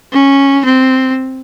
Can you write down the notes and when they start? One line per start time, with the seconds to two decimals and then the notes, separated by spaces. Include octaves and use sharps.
0.13 C#4
0.65 C4